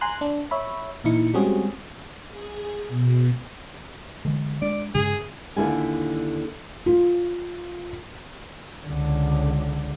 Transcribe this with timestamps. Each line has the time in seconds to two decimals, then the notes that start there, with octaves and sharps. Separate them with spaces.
0.01 G#5 A#5 C6 F#6
0.21 D4
0.51 C#5 E5 B5
1.04 A#2 E3 D#4 E4 C#7
1.34 G3 G#3 C4 C#4 F#4 G#4
2.30 G#4
2.88 B2
4.25 D3 E3 G#3
4.62 G#3 D4 D5
4.94 G2 C#3 G#3 G#4
5.56 D#2 D3 E4 F4 D5 G#5
6.86 F4
8.85 C#2 D3